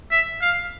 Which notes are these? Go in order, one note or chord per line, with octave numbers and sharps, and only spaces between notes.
E5
F5